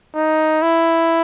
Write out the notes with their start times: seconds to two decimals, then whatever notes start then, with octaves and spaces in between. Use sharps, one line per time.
0.15 D#4
0.62 E4